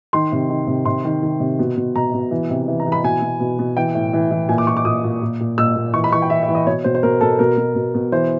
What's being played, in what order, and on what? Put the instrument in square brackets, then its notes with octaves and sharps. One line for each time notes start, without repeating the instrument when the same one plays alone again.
[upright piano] D#3 C6
C3
D#3
C3
C3 C6
D#3
D#3
C3
B2
B2
B2 A#5
B2
E3
C3
E3
A#5
E3
B5
B2 G#5
B2
B2
B2
E3 G5
A2
E3
E3
A#2 G#5
D6
A#2 C#6
D6
A#2 D#6
A#2
A#2
A#2
A#2 E6
A#2
E3 C#6
B5
E3 C#6
G5
E3 E5
E5
E3
D#5
B2 C#5
B2 C5
C5
B2 A#4
B2 A4
B2 A#4
B2
B2
B2
E3 C5